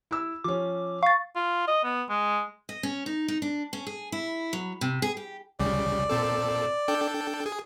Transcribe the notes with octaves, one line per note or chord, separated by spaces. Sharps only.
E4 E6
F3 C#4 D6
F5 C#6 A6
F4
D#5
B3
G#3
D#5
C#4
D#4
D#4
D4
C#4
G#4
E4
F#3
C3
G#4
G4
C#2 C#3 G3 D5
A#2 C4 A4
D4 A4 G5
G#4